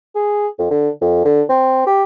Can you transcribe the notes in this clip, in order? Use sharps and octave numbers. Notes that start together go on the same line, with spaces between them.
G#4
F2
D3
F2
D3
C4
G4